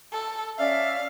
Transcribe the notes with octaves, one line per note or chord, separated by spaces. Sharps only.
A4
C#4 D5 E5 F5